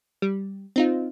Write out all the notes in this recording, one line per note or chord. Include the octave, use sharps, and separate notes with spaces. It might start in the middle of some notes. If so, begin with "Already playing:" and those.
G3
C4 D#4 F4